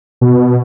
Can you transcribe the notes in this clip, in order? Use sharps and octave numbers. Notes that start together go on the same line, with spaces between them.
B2